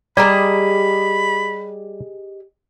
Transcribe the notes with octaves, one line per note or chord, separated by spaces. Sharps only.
G3 G4 G#4 D5 D#5 A#5 B5